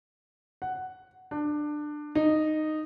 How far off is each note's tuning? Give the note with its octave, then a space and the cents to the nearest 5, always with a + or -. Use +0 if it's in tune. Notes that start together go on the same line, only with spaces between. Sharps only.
F#5 +5
D4 +20
D#4 -10